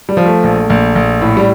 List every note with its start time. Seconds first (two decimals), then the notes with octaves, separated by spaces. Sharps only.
0.09 G3
0.17 F3
0.26 A3
0.44 A#1
0.70 A#1
0.95 A#1
1.21 A2
1.37 G3